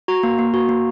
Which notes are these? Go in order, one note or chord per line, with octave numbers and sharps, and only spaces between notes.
F#4 A#5
A#3
A#3
F#4
A#3